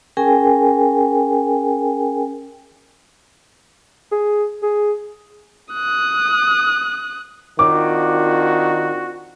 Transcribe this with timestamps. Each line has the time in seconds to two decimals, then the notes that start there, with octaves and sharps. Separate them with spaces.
0.17 C#4 G#4 A#4 G5 G#5
4.12 G#4
4.63 G#4
5.74 D#6 F#6
7.59 D#3 C4 D4 F4 F#4 D6